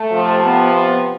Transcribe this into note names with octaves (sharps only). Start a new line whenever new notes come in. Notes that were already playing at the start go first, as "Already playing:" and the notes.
Already playing: A3
C3 F3
B3
B3